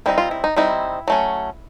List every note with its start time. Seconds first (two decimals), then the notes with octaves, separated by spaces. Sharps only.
0.06 G3 C4 D#4 E4
0.18 F4
0.31 E4
0.44 D#4
0.56 G3 C4 D#4 E4
1.08 F#3 A3 C#4